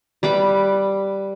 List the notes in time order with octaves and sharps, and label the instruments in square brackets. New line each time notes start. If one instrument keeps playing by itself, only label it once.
[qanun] G3 B4 D6